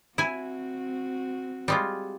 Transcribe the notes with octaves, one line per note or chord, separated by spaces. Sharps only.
C4 E4 F#4 G#5
G3 G#3 F4